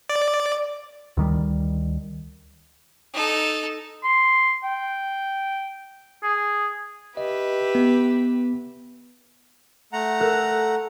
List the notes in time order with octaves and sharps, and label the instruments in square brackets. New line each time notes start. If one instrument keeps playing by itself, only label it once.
[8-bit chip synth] D5
[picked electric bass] D2 D#3 G3
[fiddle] D#4 A4
[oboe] C6
G5
G#4
[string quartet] G4 B4 E5 [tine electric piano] D#5
[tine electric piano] B3
[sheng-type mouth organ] A3 F#5 A#5
[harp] A4 A#4 F#6